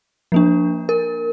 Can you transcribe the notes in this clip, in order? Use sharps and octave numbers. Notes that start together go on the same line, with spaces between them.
F3 A#3 D4
A#4